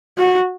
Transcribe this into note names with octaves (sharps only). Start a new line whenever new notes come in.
F#4